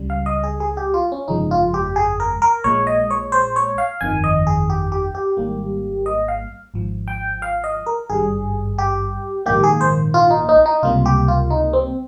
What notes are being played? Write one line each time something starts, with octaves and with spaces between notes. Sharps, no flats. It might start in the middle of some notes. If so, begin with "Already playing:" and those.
Already playing: C#2 C#3 G3
F5
D#5
G#4
G#4
G4
F4
C#4
G1 F2 C#3 F3 G#3 D#4
F4
G4
G#4
A#4
A#4
A#1 A#2 G#3 C#5
D#5
C#5
C5
C#5
F5
G1 F2 D#3 G#5
D#5
G#4
G4
G4
G4
G#1 G#2 G3 A#3
D#5
F5
G#1 G#2 F3
G5
F5
D#5
A#4
G#1 G2 G3 G#4
G4
A#1 G#2 D#3 A#3 G4
G#4
C5
F4
D#4
D#4
D#4
C#2 C3 G3 A#3 F4
G4
F4
D#4
C4